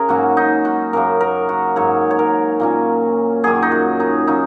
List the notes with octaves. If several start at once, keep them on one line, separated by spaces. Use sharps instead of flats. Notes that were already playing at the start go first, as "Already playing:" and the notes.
Already playing: C#3 G#4 A#4
G#2 F#3 A#3 C#4 F#4
D#4
F#4
F#2 C#3 A#3 A#4
A#4
F#4
G#2 F#3 A#3 C#5
C#5
A#4
A#2 A#3 C#4
F#2 D#3 F#3 G#4
D#4
F#4
D#4
F#3 A#3 C#4 D#4